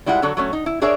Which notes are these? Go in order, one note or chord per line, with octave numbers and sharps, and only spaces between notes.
G3 G#3 E4 F4 F#5
D3 F#3 F#4 A4
F#3 A3 C#4
D#4
E4
D4 G#4 A#4 C#5 D5 E5